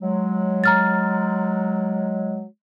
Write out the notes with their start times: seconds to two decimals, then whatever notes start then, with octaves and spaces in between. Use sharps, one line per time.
0.01 F#3 G#3
0.64 A#5 F6 A6